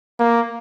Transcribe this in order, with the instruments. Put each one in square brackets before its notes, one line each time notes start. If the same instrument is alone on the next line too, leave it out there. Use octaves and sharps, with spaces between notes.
[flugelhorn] A#3